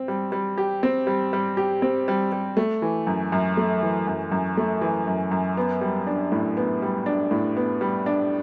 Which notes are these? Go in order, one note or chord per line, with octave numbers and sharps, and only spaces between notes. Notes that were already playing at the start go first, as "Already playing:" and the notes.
Already playing: C4
G3
G3
G4
C4
G3
G3
G4
C4
G3
G3
A3
E3
F#2
F#2
A3
E3
F#2
F#2
A3
E3
F#2
F#2
B3
G3
D4
A2
B3
G3
D4
A2
B3
G3
D4